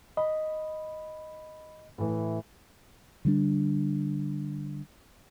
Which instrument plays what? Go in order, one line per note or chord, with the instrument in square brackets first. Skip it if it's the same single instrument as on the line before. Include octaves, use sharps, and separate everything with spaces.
[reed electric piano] D#5 [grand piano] B5
[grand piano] A2 E3
[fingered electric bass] D3 G3 D4